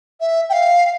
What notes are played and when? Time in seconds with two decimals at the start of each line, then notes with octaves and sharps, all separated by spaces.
0.20 E5
0.49 G5
0.53 F5